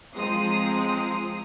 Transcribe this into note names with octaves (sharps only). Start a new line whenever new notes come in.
F3 G#3 C4 A#5 D#6 C7